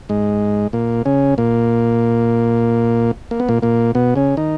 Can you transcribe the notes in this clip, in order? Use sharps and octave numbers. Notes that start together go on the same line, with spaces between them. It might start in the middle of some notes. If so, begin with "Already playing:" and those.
G#2 G#3
A#2 A#3
C#3 C#4
A#2 A#3
A#3
B3
A#2 A#3
A#2 A#3
B2 B3
C#3 C#4
D#3 D#4